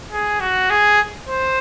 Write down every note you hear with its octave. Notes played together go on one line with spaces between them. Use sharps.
G#4
F#4
G#4
C5